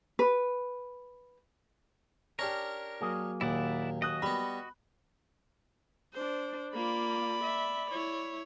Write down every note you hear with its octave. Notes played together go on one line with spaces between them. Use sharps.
B4
C#4 D4 G4 A#4
F#3 A#3 G#4
D#2 A#2 E4 D5 F#5
F#4 D#5 D#6 F#6
G3 B3 B5
D4 C5
A#3 F4 D5 B5
E5
E4 C#5